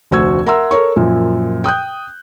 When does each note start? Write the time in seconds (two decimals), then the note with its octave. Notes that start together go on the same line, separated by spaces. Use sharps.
0.11 F1 D2 F#4 C5 E6 G#6
0.46 A#4 E5 F#5 A#5 C6 E6
0.71 A4 A#4 C#5 C#6
0.96 F#2 A#2 F3
1.64 G5 D#6 F#6 G6